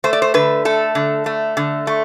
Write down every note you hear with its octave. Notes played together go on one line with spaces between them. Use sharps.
A3 C5
D5
C5
D3 B4
A3 A4
D3
A3
D3
A3